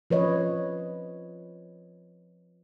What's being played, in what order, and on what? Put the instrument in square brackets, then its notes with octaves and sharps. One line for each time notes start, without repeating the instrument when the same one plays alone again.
[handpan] F3 B4 C#5 D#5